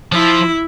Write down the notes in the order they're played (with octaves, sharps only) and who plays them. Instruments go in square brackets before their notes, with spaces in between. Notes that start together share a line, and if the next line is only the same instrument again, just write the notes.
[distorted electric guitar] F3 [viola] E4